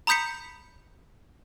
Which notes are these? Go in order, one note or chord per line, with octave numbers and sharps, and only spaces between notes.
A#5 B5 D#6 G6 B6 C#7